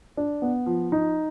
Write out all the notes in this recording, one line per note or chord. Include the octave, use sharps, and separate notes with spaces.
D4
B3
F3
D#4